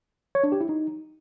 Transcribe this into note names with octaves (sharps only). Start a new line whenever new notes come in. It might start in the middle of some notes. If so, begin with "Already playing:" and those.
C#5
D4
G4
E4
D#4